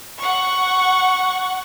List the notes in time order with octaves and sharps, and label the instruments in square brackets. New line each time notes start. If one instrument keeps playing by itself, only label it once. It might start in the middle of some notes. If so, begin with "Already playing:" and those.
[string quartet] F#5 C#6